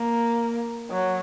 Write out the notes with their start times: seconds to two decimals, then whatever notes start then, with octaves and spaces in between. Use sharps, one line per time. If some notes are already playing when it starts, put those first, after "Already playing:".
Already playing: A#3
0.90 F#3